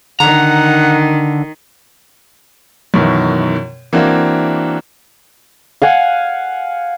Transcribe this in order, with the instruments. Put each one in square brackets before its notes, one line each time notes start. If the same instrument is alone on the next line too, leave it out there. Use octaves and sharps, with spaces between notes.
[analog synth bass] D3 [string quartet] D#3 [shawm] F#5 [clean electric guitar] A#5
[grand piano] F#2 B2 D#3 E3
E3 A#3 C4 D4 F#4
[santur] F5 F#5 G#5